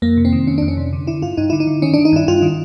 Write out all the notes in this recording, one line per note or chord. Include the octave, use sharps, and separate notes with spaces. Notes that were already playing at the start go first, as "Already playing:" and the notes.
F2 A#3
C3
C4
D#3
F2 C#4
F2 D4
C#4
C3
D3
D3 E4
G2 F4
G2 D#4
D3 E4
D#4
D3
D#3 C#4
D#3 D4
D#4
G2 E4
G2 F4
D#3